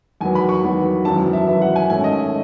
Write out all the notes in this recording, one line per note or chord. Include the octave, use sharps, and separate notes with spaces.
E2 D#3 F#3 B3 G#5
B5
C#6
E2 D#3 F#3 B3
G#1 F#2 E3 B3 A5
E5
G#1 F#2 E3 B3 E5
F#5
G#5
G#2 D#3 A3 C#4 G#5
D#5
E5